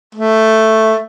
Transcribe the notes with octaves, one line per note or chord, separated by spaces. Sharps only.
A3